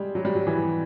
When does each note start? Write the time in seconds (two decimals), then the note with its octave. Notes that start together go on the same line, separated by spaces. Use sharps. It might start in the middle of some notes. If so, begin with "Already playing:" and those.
Already playing: G3 G#3
0.15 F#3
0.25 G3
0.35 F#3
0.47 E3